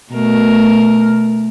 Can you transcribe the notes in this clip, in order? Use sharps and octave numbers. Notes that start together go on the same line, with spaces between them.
B2 A3 A#4